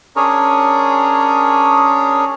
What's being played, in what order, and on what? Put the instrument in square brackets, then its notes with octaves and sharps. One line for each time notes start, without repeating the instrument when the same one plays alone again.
[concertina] C#4 D4 G#4 A#4 C#5